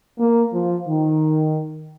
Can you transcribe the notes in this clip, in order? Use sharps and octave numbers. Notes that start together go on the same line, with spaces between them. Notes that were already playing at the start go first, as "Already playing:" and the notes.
A#3
F3
D#3